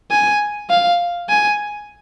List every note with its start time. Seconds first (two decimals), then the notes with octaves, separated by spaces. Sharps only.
0.11 G#5
0.70 F5
1.29 G#5